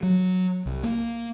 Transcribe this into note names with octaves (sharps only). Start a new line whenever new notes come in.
F#3
C2
A#3